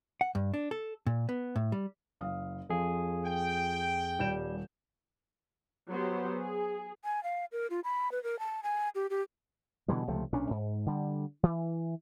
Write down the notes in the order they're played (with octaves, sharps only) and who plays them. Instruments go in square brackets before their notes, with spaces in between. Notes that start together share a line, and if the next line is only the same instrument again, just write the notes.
[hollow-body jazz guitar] F#5
G2
D4
A4
A#2
B3
A2
G3
[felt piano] F#1 F5 D#6
[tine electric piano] F2 G#4 [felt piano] F3
[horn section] G5
[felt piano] D#1 G6 E7 [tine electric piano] G3
[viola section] F#3 B3 G4 C5
G#4
[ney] G#5
F5
A#4
F4
B5
B4
A#4
A5
G#5
G4
G4
[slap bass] B2 D3 E3 G3
C#2 C3 F3 A3
B1 A#2 C#4 D4
G#2
D3 G3
E3